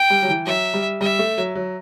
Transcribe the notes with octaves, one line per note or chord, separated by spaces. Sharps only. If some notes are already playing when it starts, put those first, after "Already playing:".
Already playing: G5
G3
F#3
E3
F#3 E5
G3
G3 E5
A3
F#3
F#3